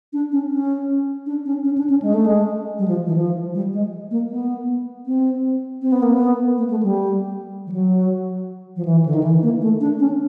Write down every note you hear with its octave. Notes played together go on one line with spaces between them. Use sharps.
D4
C#4
C#4
D4
C#4
C#4
D4
C#4
G#3
A3
G#3
G3
F3
E3
F3
G3
G#3
A#3
B3
C4
C4
B3
A#3
B3
A#3
A3
G3
F3
F#3
F3
E3
D3
D#3
E3
A#3
A3
D4
C#4